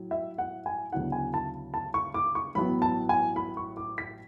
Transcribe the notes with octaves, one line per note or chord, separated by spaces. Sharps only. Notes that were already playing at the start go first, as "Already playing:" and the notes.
Already playing: A2 F#3
E5
F#5
G#5
D2 C#3 F#3 B3 E4 F#5
G#5
A5
A5
C#6
D6
C#6
A1 A2 F#3 B3 B5
A5
G#5
B5
C#6
D6
B6